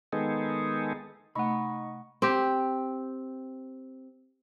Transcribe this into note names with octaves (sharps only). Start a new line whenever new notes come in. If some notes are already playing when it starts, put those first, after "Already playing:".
D#3 G#3 B3 D#4 G#4 A4
C3 A3 D#4 D#5 F#5 B5 C#6
C4 G4